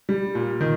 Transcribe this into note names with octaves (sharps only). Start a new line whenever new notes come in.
G3
A#2
D#3